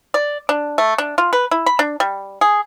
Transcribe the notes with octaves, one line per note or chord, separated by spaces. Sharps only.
D5
D4
A3
D4
F4
B4
E4
B5
D4
G3
G#4